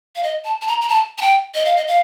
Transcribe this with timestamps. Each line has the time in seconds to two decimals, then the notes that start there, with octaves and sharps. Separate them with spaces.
0.16 F5
0.23 D#5
0.45 A5
0.62 A5
0.67 A#5
0.81 A#5
0.89 A5
1.18 A5
1.22 G5
1.55 D#5
1.65 F5
1.77 D#5
1.87 F5